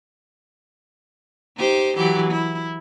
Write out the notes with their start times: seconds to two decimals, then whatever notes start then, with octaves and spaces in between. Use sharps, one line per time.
1.57 D#4 G4 C5
1.97 E3 F#3 G4
2.30 E4